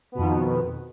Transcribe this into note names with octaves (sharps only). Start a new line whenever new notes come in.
F2 B2 D#3 B3